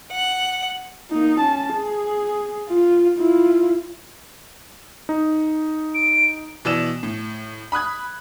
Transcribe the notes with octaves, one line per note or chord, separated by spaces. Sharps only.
F#5
A#3 D#4
C#4 A5
G#4
F4
E4 F4
D#4
D7
B2 E3 D5 E6 E7
A2
B5 D#6 F#6 G#6